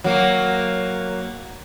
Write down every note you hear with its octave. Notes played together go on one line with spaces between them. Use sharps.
F#3 A#3